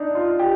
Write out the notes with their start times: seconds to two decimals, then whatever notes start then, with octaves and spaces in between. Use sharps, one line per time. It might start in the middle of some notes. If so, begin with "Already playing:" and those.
Already playing: D4 D#4
0.15 F4
0.39 G4